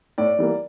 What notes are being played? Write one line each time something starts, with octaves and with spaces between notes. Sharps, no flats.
A2 D5
E3 G3 A#3